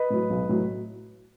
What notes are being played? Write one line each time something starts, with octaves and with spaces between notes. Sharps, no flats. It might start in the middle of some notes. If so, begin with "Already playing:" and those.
Already playing: B4 D#5
A2 F#3
B1
A2 F#3